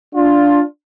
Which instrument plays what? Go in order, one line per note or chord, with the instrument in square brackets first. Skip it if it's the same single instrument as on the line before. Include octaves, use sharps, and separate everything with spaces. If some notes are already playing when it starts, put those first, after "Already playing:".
[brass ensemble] D4 F4